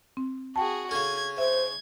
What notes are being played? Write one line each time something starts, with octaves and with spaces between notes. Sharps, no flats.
C4
F#4 G#4 G5 A5
C#3 C#4 A4 G#6
C5 E5 G#6